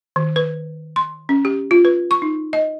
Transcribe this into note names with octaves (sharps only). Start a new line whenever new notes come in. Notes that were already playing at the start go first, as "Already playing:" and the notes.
D#3
B4
C6
C#4
G4
F4
B4
C#6
D#4
D#5